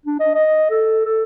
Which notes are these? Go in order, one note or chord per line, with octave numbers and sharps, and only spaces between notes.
D4
D#5
D#5
A4
A4